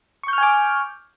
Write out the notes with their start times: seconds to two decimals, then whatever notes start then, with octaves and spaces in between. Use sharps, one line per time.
0.23 C#6
0.28 G6
0.33 F6
0.38 G#5
0.43 D6